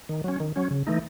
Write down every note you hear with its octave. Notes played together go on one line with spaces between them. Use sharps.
D#3
F#3 C#4
D#3
F#3 C#4
C#3
E3 A3 D#4